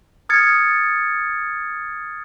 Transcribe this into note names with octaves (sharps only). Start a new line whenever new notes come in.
D#6 F6 G#6 A6 C#7